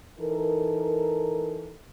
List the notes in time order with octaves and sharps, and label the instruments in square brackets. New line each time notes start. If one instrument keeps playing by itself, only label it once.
[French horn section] E3 D#4 A4 A#4